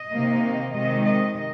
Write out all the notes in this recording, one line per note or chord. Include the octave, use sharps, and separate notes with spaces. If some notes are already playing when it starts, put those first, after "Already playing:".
Already playing: D#5
C3 D#3 A#3
C3 D#3 G#3 D#5
D#5